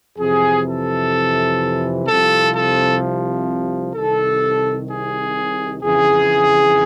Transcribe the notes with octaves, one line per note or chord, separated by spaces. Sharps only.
F2 C3 E3 G#4
A4
C2 C3 F3 A4
A4
C2 C3 D#3 A4
G#4
F2 C#3 E3 G#4